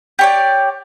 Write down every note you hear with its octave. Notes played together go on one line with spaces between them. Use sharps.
G4 C#5 D5